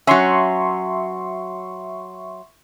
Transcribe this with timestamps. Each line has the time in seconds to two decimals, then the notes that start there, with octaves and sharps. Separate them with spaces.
0.07 F#3 C#4 E5 C6 C#6